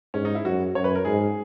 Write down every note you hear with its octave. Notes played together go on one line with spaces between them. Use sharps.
G#2 C#4
D#4
E4
F#2 F#4
F#2 C#5
B4
A#4
G#2 G#4